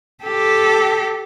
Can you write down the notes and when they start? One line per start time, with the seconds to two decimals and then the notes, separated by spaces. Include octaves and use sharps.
0.24 G4 A4